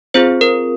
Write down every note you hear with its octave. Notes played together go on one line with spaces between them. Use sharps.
C4 F4 G#4 C5
A#4